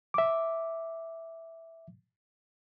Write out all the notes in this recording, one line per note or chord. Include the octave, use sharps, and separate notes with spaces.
E5 D6